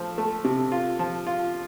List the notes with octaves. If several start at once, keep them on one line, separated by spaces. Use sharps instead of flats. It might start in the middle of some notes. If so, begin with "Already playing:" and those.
Already playing: F3 A3
A3
C3
F4
F3
F4